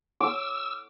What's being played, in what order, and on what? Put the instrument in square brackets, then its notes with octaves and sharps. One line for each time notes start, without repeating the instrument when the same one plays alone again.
[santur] D6 [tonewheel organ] E6